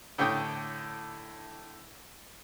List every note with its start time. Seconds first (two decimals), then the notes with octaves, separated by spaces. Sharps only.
0.18 A2 D3 C#5 G5 D#6